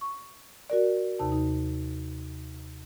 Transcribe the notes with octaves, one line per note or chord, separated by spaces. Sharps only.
C#6
F#4 A#4 D5
D#2 C3 D#4 A5
D#4